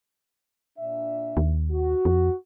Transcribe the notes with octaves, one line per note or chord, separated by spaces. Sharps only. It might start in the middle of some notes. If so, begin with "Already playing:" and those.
A#2 D4 E5
D#2
F#4
F2